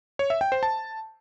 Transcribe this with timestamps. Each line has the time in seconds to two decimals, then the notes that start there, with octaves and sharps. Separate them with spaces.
0.19 C#5
0.30 E5
0.41 G5
0.52 C5
0.63 A5